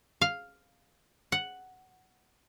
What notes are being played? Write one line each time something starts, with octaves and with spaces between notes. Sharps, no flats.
F5
F#5